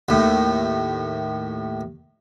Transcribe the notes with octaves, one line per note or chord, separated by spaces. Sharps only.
D#2 A2